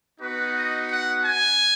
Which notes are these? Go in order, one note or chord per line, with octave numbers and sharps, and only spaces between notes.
B3 D#4 F#4 B4
D#5
F#5
G#5